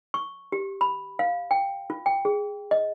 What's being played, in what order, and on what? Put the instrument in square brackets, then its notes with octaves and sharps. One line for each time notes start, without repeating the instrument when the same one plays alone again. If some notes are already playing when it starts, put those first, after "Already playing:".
[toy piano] C#6
G4
B5
F5
G5
F4
G5
G#4
D#5